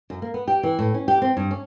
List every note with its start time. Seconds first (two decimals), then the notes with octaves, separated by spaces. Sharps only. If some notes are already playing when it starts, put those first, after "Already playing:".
0.10 F#2
0.22 A#3
0.34 B3
0.48 G4
0.63 E3
0.79 A2
0.94 C#4
1.08 G4
1.22 C4
1.37 G2
1.51 C#4